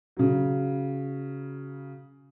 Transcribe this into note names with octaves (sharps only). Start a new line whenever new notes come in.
C#3 F#3